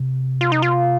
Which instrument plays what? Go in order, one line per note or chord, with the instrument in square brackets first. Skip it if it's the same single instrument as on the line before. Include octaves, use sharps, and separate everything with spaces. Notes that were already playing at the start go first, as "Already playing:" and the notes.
Already playing: [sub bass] C3
[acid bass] F4
D#4
F4